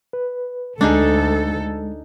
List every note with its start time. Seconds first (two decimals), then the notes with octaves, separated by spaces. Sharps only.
0.13 B4
0.81 D2 G#3 D4 D#4 G#4 A4